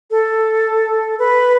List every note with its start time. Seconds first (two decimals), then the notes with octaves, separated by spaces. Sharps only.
0.11 A4
1.19 B4